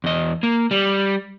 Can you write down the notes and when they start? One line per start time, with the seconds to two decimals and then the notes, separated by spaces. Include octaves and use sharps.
0.04 E2 D#5
0.43 A#3
0.71 G3